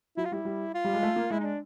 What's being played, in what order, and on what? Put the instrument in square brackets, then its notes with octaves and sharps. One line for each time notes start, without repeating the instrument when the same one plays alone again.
[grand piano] F#3 [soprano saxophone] E4
[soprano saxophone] F4
[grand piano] G3 [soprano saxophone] E4
[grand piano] G3
[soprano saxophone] F4
[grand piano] G3
G#3
A3
A#3
[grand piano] G#3 [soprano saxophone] E4
[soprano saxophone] D#4
D4